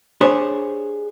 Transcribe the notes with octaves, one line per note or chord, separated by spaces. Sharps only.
D4 G4 G#4 C5 C#5